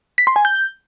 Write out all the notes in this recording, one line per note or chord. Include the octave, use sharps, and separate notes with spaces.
B6
C6
G#5
G6